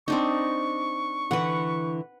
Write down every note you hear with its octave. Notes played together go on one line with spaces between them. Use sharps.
C4 D4 D#4 C#6
D3 E3 B4 F#5